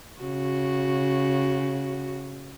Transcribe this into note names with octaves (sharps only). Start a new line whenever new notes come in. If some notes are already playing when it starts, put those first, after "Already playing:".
C#3 F#4